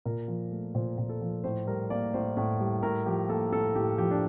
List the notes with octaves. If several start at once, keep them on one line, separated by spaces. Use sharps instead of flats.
A#2 A#4
F3
A3
A#2 C5
A#2
A4
F3
A2 C5
G3 A#4
A#3 D5
A2 C5
A2
G3
A2 A#4
F3 G4
A#3 A4
A2 A4
A2 G4
F3 G4
D4